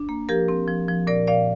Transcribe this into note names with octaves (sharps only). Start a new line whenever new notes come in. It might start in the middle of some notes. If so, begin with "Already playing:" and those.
Already playing: D4
A#3
F3 G4 A#4
C4
F3
F3
A#2 A#4 D5
A#2 D5 F5